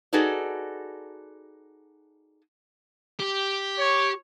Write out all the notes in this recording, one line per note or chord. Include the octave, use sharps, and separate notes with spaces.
D#4 F#4 G#4 A4 B4 D5
G4
C#5